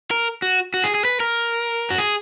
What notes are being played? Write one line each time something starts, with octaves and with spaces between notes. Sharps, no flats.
A#4
F#4
F#4
G#4
G#4
B4
A#4
F#4
G#4